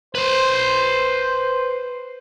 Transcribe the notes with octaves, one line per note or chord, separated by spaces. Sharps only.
B4 C5 C6